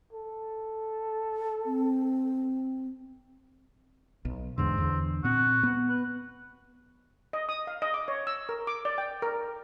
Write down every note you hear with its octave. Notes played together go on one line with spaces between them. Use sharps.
A4
C4
B1
E2 G#2 D3 C4
E2 D3
A#2 C4 F#4
B3
B4
D#5
D#6
F5
D#5
D6
C#5
E6
A#4
D6
D5
G5
A#4